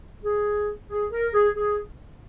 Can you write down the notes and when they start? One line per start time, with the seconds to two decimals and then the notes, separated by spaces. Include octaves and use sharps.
0.24 G#4
0.90 G#4
1.12 A#4
1.33 G#4
1.55 G#4